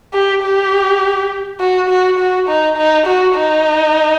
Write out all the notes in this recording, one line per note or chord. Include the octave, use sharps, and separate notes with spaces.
G4
G4
F#4
F#4
F#4
D#4
D#4
F#4
D#4